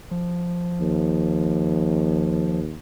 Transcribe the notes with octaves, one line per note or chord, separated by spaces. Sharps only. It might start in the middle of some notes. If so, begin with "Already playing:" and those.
F3
D#2